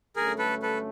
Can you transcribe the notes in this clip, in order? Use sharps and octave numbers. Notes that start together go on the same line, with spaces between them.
G2 D3 F#3 A3 C#4 G#4 A#4
A4 B4
A4 B4